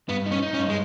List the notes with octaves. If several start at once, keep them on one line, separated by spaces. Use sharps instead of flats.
G2 B3
D#4
C#4
D#4
C#4
G2
G#3